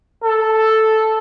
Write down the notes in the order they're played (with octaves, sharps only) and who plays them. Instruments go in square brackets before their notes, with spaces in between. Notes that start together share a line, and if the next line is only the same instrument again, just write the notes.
[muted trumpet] A4